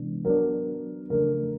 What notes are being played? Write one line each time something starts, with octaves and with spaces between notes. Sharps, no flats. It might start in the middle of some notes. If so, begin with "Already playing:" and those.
Already playing: C3 E3 G#3 B3 D4
F#3 B3 D4 A#4
E2 C#3 F3 A3 D4 A#4